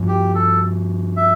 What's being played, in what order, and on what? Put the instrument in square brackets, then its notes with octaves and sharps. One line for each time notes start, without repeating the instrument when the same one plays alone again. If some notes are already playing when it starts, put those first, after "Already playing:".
Already playing: [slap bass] G2 F3 C4
[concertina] G4
A4
E5